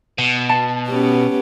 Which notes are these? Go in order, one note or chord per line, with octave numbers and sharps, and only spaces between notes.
B2
A5
B3 C#4 G4